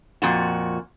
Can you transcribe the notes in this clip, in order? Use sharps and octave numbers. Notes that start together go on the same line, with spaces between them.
F2 A#2 F#4